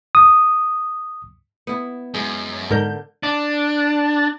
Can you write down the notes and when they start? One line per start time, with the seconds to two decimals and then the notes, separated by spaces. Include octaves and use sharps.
0.15 D#6
1.67 B3 E4
2.14 F#2 G#3 E4
2.70 G#2 D3 A#4 G6
3.23 D4